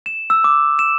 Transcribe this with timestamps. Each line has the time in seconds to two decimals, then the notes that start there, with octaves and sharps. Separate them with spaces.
0.06 E7
0.30 E6
0.44 D6
0.79 E7